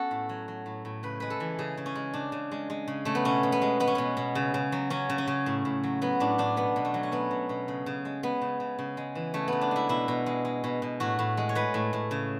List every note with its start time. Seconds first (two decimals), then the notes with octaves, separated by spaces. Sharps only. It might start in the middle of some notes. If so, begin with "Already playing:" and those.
Already playing: B3 C#4 F#4 A4
0.11 A2
0.29 F#3
0.48 F#3
0.66 A2
0.85 A2
1.03 C#3 B4
1.20 G#3 B4
1.30 A4
1.40 E3
1.59 C#3 G#4
1.77 C#3
1.86 C#4
1.95 G#3
2.14 C#3 D4
2.32 C#3
2.51 G#3
2.70 G#3
2.88 C#3
3.05 C#3 A3
3.15 B3
3.25 B2 C#4
3.43 B2
3.52 B3
3.62 G#3
3.80 G#3 B3
3.87 C#4
3.95 B2 B3
4.17 B2
4.35 C#3
4.54 C#3
4.72 F#3
4.90 F#3 C#4
5.09 C#3
5.18 C#4
5.27 C#3
5.46 A2
5.65 A2
5.84 F#3
6.01 F#3 B3
6.20 A2 D4
6.38 A2 D4
6.57 B2 B3
6.76 B2
6.85 A3
6.94 F#3
7.03 C#4
7.12 F#3 B3
7.31 B2
7.49 B2
7.68 C#3
7.86 C#3
8.05 G#3
8.23 G#3 B3
8.42 C#3
8.60 C#3
8.79 C#3
8.97 G#3
9.15 E3
9.34 C#3 A3
9.48 C#3 B3
9.61 D4
9.71 G#3 E4
9.89 B2 E4
10.08 B2
10.26 G#3
10.45 G#3
10.64 B2
10.82 B2
11.00 A2 F#4
11.19 A2
11.37 G#3
11.49 C#5
11.55 G#3 B4
11.74 A2
11.93 A2
12.11 C#3